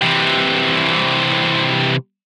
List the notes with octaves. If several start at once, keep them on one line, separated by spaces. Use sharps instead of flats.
C3 E3